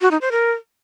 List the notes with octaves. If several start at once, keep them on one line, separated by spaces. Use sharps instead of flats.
F#4
D#4
C5
A#4